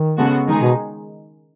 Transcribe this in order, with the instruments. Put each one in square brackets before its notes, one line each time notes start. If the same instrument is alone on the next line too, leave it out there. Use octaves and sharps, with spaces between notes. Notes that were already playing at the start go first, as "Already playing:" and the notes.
Already playing: [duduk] D#3
[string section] C#3 G#3 B3 F#4 A4
D#3 G#3 D#4 G#4
[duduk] B2